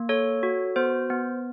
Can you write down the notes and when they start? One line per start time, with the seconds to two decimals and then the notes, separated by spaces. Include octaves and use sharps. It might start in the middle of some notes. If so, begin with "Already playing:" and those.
Already playing: A#3
0.09 A4 C#5
0.43 F#4
0.76 B3 C5
1.10 B3